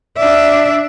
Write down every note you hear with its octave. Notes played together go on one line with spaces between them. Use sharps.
D4 E5